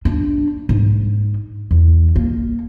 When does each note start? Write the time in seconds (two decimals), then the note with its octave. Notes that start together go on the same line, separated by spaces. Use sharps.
0.05 D4
0.69 G#2
1.71 E2
2.16 A#3